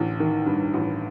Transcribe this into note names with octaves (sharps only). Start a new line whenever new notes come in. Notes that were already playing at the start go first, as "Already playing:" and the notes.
Already playing: A1 D3
D#3
G2
A1